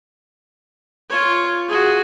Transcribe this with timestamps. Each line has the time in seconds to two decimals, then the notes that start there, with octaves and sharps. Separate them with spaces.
1.10 F4 C#5
1.68 F#4 G#4